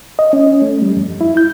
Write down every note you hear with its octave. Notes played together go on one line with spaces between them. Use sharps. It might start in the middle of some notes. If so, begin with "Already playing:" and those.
D#5
C#4
C#4
A3
G3
F2
E4
G6